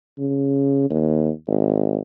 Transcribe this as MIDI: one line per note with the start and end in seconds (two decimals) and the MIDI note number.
0.19 0.88 49
0.90 1.30 39
1.47 1.99 32